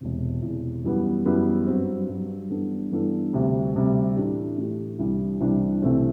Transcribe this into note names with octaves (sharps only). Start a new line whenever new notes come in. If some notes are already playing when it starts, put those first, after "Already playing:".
E1 E2 C3
E1 E2 C3
F#2 E3 G3 B3
F#2 E3 G3 B3
G2 F#3 C4
G2 F#3 C4
G2 E3 B3 D4 A4
G2 E3 B3 D4 A4
D2 C3 G3
D2 C3 G3
A2 E3 A3 D4 G4
A2 E3 A3 D4 G4
C2 C3 E3 G3 D4
C2 C3 E3 G3 D4
C2 C3 E3 A3 C4